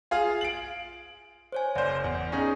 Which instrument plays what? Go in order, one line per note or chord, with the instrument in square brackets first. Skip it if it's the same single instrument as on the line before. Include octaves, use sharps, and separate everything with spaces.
[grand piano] F4 G#4 F5
D7 F#7
[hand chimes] C5 C#5 G#5
[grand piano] F#1 C5 [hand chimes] D5
[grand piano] E2
C#4 D#4 G#4